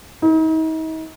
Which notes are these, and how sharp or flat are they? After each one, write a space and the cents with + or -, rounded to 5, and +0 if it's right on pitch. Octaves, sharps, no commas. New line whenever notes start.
D#4 +40